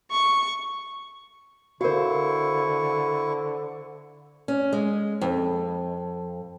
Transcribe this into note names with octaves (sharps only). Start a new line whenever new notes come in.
C#6
D3 E4 F#4 A#4 C5 F5 C#6
C#4
G#3
F2